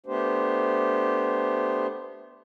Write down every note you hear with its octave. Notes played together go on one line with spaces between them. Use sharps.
A3 B3 D4 G4 C5